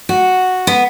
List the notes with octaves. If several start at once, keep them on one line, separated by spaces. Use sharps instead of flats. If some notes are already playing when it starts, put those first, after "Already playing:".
F#4
B3